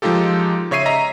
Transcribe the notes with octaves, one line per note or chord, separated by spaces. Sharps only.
F3 G#3 D#4 F4 G4 A4
C#3 C#5 E5 C7 D#7
D#5 E5 A#5